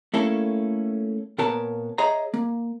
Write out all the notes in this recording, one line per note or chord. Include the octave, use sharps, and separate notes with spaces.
A3 A#3 C#4 E4 A4
A#2 B3 A#4 C#5 A5 A#5
G#4 C#5 D#5 E5 A#5
A#3